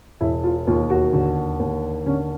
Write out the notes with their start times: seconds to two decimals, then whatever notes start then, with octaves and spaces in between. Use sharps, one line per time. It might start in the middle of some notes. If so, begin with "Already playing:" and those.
0.21 E1 E4
0.44 F4
0.67 D#2 F4
0.90 F#4
1.13 D3
1.60 D#2
2.06 D3 C#4